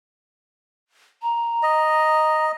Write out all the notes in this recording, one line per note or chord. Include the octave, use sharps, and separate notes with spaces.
A#5
D#5